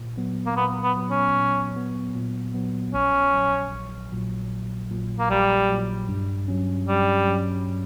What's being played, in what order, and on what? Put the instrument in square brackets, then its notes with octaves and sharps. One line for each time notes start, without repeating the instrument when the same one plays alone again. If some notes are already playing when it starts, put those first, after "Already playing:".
Already playing: [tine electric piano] A#2
F#3 B3
[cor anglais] A#3
[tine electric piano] A#2 [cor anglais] B3
[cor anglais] B3
[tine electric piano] F#3 B3
[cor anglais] C#4
[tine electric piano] A#2
F#3 B3
A#2
F#3 B3
[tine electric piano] A#1 [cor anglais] C#4
[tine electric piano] A#2 F#3
A#1
A#2 F#3
A#1
A#2 F#3
[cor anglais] A#3
[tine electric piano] A#1 [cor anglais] G3
[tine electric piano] A#2 F#3
G2
F#3 C#4
[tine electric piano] G2 [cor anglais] G3
[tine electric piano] F#3 C#4